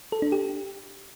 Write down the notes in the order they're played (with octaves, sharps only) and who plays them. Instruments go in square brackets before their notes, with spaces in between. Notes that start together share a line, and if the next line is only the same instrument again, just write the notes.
[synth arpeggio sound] A4
D4
G4